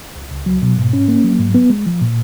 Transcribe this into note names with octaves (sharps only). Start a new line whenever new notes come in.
C#2
C#2
F#3
B2
G#2
C#4
A#3
F#3
G#2
B3
G#3
F3
A#2